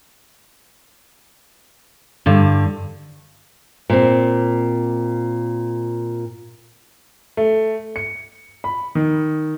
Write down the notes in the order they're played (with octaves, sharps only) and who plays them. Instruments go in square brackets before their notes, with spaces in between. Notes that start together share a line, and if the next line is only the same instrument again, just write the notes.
[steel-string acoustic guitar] G2 D3
[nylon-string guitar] A#2 C4
[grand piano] A3
C#7
B5
D#3